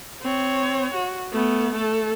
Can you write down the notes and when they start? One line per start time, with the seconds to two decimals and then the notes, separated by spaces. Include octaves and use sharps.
0.22 C4 C#5
0.94 F#4
1.32 A3 B3
1.73 A3 A4